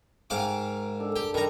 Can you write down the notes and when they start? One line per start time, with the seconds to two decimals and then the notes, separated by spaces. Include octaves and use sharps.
0.30 G#2 D#3 F5 D6
1.00 D4 A4
1.16 G4
1.34 D#3 G3 D4 A#5